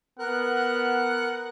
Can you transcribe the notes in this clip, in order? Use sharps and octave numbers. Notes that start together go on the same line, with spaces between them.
B3 A#4 F#5 F#6